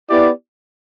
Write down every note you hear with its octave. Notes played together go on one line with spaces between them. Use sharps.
B3 E4 G4 D5